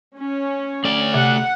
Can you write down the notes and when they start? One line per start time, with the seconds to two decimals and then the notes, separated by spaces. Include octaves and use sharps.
0.16 C#4
0.84 A3 D5
1.14 C3 F#5